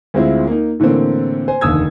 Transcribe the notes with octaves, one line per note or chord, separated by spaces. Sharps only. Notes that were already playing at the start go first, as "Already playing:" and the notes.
D2 G#3 C4 E4 F4
A#3 D#4
A2 D3 E3 A#3 C4
C5 G#5
F1 D#2 D3 D#6 E6 G#6